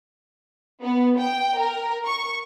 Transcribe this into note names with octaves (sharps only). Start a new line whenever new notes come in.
B3
G5
A#4
C#6